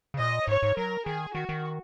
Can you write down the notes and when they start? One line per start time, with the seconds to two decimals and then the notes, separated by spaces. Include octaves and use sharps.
0.14 C#3
0.19 A#2 D#5
0.47 G#2 C#5
0.62 G#2
0.77 F#3 A#4
1.06 D#3 G#4
1.34 D#3 F#4
1.49 D#3